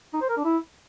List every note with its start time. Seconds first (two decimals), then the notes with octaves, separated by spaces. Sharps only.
0.13 D#4
0.21 C5
0.29 A#4
0.37 D4
0.45 E4